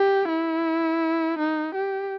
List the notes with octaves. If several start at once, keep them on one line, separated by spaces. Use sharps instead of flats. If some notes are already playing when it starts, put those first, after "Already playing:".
Already playing: G4
E4
D#4
G4